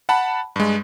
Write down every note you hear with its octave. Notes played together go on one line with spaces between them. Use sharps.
F#5 A5 B5
G2 G#3